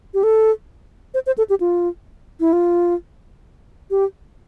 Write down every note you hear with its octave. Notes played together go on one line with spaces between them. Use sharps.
G4
A4
C5
C5
A4
G4
F4
E4
F4
G4